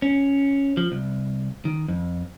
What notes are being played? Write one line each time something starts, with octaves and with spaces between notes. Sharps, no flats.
C#4
F3
C2
D#3
F2